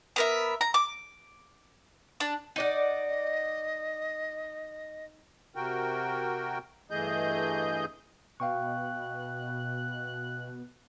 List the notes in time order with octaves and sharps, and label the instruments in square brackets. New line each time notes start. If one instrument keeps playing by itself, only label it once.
[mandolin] B3 A#4 E5
A#5
D6
D4
[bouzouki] D#4 D5 F#5 [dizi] D#5
[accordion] C3 F#4 A#4 G5
G2 E3 A3 G#4 D#5 G6
[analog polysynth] B2 [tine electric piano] F5 G5 C#6 [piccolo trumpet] F#6